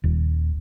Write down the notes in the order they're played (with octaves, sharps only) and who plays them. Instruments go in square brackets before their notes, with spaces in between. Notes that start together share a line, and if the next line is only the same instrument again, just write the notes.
[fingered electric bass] D#1